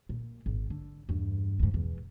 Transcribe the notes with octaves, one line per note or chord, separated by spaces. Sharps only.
A#2
G#1
D3
E2 G2
D2 G#2
E2 B2